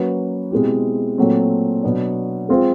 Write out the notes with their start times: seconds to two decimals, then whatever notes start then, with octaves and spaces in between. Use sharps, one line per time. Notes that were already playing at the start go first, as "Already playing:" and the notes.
Already playing: F#3 A#3 C#4 F#4 B4
0.51 B2 G#3 C4 E4 G4
1.18 A#2 F#3 A3 C4
1.83 B2 F#3 B3 D4
2.49 G#3 C4 F4 G#4 C5